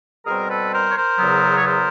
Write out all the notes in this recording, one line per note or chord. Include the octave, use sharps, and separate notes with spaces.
B2 G3 C4 G#4 A#4
A4 B4
A#4 C5
C#5
A#4 C5
E2 C#3 F#3 B3
C#5
A#4 C5